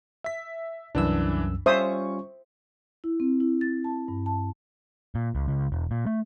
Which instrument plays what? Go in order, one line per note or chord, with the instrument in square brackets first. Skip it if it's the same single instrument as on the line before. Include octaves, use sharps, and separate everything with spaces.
[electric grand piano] E5 B6
[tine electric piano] C2 F#2 E6 [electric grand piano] E3 D4
[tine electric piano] G3 C#4 F4 [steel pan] C5 E5 D#6 [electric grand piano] C#6
[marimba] E4
C4
E4
A6
A5
G2
A5
[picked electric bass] A#2
C#2
C#2
E1
A#2
A3